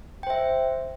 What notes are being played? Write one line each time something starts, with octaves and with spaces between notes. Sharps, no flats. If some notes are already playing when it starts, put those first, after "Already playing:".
C5 E5 G5